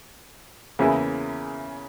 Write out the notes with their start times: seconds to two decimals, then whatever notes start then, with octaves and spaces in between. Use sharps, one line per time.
0.79 E2 C#3 E3 A#3 E4 G#4